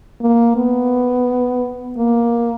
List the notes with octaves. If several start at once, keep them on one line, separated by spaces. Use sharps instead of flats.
A#3
B3
A#3